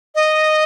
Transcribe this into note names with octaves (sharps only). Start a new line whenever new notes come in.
D#5